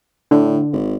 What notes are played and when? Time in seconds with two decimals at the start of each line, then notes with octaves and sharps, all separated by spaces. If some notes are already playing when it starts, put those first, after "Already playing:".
0.31 A2 D3
0.73 G#1